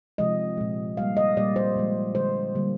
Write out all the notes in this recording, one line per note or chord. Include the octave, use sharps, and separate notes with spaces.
C3 F3 G#3 D#5
A#2 G#3
A#2 G3 A#3 F5
D#5
A#2 G3 A#3 D5
C5
A#2 F3 G#3
D3 F3 G#3 C5
D3 G3 A#3